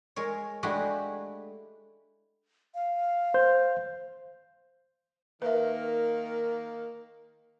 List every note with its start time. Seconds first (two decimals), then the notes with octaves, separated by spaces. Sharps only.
0.16 G#3 A#4 C#5
0.63 G#3 A3 D4 E4 F#4 G4
2.74 F5
3.34 C5 G6
5.42 D#3 A#3 B4 E5